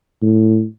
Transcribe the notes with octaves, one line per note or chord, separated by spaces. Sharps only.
A2